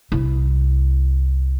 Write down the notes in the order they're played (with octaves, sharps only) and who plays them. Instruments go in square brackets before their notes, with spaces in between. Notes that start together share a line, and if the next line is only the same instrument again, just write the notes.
[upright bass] C2 E4